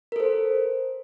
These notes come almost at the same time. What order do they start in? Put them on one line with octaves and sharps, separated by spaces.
A#4 A4 C5